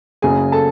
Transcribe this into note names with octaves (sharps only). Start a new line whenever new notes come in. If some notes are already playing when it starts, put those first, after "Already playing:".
F#1 F#2 C#3 G#4 G#5
A4 A5